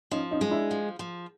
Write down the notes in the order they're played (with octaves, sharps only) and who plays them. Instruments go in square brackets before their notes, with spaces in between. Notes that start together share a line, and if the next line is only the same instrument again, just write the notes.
[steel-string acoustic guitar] F3 [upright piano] C#4 D#4
[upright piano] C#4 D#4
[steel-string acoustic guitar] G#3
[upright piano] D4 E4
[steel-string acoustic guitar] F3
F3